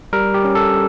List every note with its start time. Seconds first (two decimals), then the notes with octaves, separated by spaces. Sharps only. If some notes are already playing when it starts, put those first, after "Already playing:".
0.13 G3 A#4
0.34 G4
0.44 C#4
0.55 A4